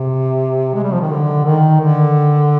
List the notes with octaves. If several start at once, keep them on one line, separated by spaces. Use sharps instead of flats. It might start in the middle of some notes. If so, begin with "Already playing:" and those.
Already playing: C3
G#3
G3
F3
D#3
D3
D#3
D3